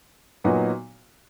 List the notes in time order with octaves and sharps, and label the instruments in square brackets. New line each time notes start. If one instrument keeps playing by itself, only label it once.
[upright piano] A#2 F#3 B3 D#4 F#4